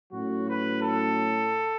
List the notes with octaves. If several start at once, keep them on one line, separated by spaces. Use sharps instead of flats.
A2 F#3 C#4 F#4
B4
A4